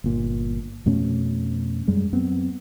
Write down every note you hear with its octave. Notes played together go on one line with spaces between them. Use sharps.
G1 A#2
F2 B2 A3 C#4
F#2 G3 G#3
F#2 B3 C4